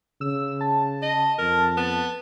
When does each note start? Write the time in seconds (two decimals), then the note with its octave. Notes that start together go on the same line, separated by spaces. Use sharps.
0.21 C#3 E6
0.61 A5
1.02 D#5
1.39 F2 A#4
1.77 B3